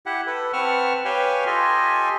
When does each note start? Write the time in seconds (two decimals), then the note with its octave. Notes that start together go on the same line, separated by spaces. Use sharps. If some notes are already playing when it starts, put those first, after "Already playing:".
0.06 E4 G4 F#5
0.27 A4 B4
0.53 C4 B4 F#5 A5 C#6 F6
1.05 G4 B4 C#5 F5 G5 G#5
1.47 F4 G4 A4 D#5 G#5